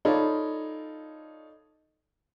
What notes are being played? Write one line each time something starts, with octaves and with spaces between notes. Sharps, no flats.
D#4 F4 A4 C#5 D5 B5